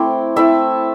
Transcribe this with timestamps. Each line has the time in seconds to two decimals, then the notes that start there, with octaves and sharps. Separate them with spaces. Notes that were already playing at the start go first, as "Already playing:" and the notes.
Already playing: A3 C4 E4 D6
0.36 A3 C4 E4 E5 A5